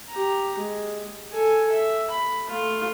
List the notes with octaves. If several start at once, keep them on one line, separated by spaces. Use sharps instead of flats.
G4 A#5
G#3
A4 G#5
E5
B5
A3 F4